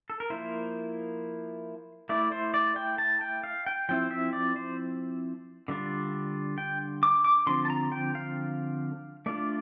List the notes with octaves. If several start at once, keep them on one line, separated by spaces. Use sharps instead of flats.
A4
A#4
F3 A#3 E4 C5
A3 E4 D5
C5
D5
G5
A5
G5
F5
G5
F3 C4 E4 G5
E5
D5
C5
D3 G3 D4 F4
G5
D6
D6
D3 F3 C4 C6
A5
A#5
G5
F5
A3 D4 F4 D5